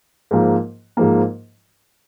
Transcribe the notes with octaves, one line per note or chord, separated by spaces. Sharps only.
G#2 F3 A#3
G#2 F3 A#3